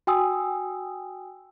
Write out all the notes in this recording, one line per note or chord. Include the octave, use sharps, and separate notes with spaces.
F#4 G5 G#5 D#6 E6